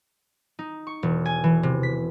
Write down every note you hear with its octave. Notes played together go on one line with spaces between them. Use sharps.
D#4
C#6
E1
G#5
E3
C3
B6